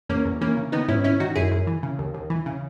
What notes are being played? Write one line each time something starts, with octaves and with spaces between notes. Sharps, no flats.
E2 A#3 C#4
E2
E3 A#3 C#4
C#3
D#3 B3 D#4
G#2 C#4 E4
G#2 C#4 E4
D#3 D#4 F#4
F#2 E4 G#4
F#2
E3
C#3
D#2
D#2
E3
C#3